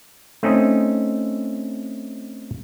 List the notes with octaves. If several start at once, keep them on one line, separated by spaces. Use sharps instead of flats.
A3 C4 C#4 D#4 D#5